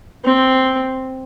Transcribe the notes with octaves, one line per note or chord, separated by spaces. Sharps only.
C4